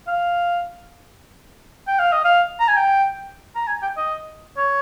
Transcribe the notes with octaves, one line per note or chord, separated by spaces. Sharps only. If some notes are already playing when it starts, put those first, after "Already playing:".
F5
G5
F5
D#5
F5
A#5
G#5
G5
A#5
G#5
G5
D#5
C#5